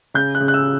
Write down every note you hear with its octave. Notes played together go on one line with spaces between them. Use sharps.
C#3 G6
F#6
C#3
F#6
E6